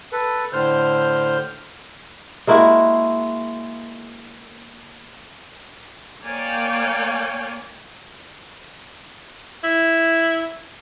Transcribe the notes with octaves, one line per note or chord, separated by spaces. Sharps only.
A4 B4
A2 D3 C5 F6 G6
G#3 A#3 E4 F#4
A#3 C#5 D5 F5 G5 G#5
E4